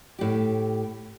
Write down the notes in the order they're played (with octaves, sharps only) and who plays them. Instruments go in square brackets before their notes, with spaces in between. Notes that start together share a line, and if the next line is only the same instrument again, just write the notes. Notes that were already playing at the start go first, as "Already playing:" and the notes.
[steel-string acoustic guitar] A2 G4